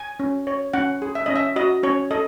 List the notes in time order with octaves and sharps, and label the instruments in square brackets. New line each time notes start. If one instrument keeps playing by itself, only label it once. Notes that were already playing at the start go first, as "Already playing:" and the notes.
Already playing: [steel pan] G#5
C#4
C#5
C#4 F#5
G#4
E5
C#4 D#5
E5
F#4 D#5
C#4 C#5
A4 D#5